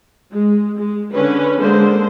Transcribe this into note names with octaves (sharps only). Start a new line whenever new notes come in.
G#3
G#3
D3 C#4 B4
D3 G#3 A#3 C5